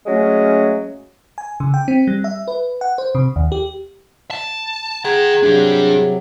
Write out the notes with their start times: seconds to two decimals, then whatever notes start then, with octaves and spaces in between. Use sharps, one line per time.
0.06 F#3 G#3 A3 C#4
1.38 G#5
1.60 C#3
1.74 G5
1.88 C4
2.07 G3
2.24 E5
2.48 B4
2.81 F#5
2.98 C5
3.15 C3
3.36 D#2
3.52 G4
4.31 A5
5.05 G#4 F#5 G5 A#5
5.43 C3 F#3 D4 G4